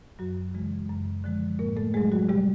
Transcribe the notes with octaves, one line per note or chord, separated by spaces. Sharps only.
F#2 F#3 F#4
C#3 E3 G#3
F#2
D3 F3 G#3
A2 A#3 A#4
A3 A4
F#3 G#3 A3 G#4
F#3 F#4
C3 G3 G4